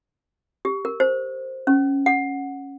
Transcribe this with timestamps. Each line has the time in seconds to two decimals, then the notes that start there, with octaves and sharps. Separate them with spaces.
0.65 G4
0.85 A#4
1.00 C5
1.67 C#4
2.06 F#5